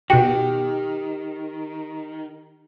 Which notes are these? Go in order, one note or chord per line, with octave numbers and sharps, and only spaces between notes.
B2 D#3 F#4 G4 G5